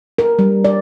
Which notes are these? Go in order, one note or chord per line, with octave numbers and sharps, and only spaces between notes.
A#4
G3
D5